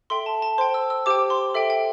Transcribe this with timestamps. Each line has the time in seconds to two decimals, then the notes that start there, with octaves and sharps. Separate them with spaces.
0.10 A4 E5 G5 C6
0.26 A5
0.42 A5
0.58 C5 G5 C6
0.74 E6
0.90 E6
1.06 G4 C5 G5 D6
1.30 C6
1.54 A4 E5 G5
1.70 G5